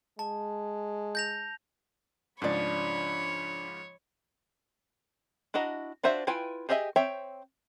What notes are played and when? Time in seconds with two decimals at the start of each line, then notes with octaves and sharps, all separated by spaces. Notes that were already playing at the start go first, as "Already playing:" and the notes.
0.19 G#3 A5
1.15 G6 A#6 F7
2.42 G#2 C#3 F3 D4 C#5 D5 B5
5.54 D4 E4 F#4 D#5 A#5
6.03 D4 F4 F#4 C5 E5
6.27 E4 F4 B4 G5 G#5
6.69 G4 G#4 D#5 E5 G#5
6.96 C4 C#5 E5 G5